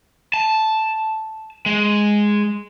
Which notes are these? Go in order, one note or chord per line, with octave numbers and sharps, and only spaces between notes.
A5
G#3